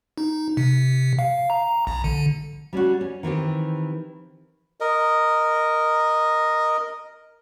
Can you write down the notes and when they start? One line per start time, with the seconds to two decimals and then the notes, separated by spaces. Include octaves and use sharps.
0.18 D#4
0.57 C3
1.19 F5
1.50 A#5
1.87 A#1
2.04 D3
2.73 G3 C#4 D4 F#4
3.01 C#4
3.23 D#3 E3 C4 G4
4.80 A#4 D#5